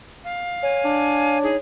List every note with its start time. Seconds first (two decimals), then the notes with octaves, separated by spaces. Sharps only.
0.24 F5
0.63 C#5 G#5
0.85 D4
1.43 D#4 G#4